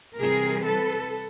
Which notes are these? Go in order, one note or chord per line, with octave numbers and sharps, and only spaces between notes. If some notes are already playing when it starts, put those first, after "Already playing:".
C3 E3 G3 C4 G#4 A#4
A4 B4